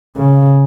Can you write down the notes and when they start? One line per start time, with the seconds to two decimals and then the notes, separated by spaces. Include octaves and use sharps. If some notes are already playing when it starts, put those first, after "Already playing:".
0.17 C#3